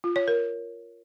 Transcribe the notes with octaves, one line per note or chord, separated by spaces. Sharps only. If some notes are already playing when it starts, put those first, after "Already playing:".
F4
C#5
A#4